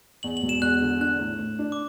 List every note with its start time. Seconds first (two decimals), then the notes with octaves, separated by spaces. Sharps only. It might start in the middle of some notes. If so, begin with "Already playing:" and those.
0.23 E2 F#7
0.37 F#7
0.42 E1
0.49 E7
0.62 E2 F#6
0.81 D3
1.00 D4 F#6
1.19 A2
1.39 A2
1.59 D4
1.72 D6